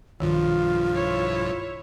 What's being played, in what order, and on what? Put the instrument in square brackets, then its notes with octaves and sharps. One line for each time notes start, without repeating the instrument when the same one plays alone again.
[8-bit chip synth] B1 G2 F3 [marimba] D#3 [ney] F4
[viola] E4 C#5